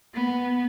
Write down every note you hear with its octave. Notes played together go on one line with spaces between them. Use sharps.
B3